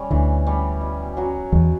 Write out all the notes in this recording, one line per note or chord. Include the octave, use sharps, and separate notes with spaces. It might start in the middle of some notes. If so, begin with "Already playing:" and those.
Already playing: G3 C#4
D2 D3 E3
G3 C#4
B2
F#3 C#4 F#4
E2 B2 E3